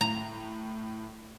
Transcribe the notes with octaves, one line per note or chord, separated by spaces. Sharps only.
A2 A#5